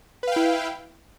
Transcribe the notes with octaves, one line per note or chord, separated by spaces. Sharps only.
E4 B4 F5 G5